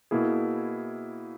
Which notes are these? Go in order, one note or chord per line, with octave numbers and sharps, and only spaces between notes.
B2 A#3 E4 G#4